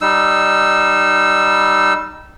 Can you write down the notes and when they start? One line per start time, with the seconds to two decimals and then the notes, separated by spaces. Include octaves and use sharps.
0.01 G3 D#4 E6